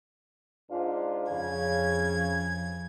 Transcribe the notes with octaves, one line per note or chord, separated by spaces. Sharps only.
G#2 D4 F4
F2 C#3 G#6